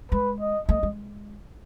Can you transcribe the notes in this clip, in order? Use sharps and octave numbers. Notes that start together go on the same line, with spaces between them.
G#3 B4
D#5
A3 D#5
G#3